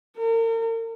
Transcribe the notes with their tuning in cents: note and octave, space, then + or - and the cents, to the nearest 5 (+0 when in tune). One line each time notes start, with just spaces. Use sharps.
A#4 -40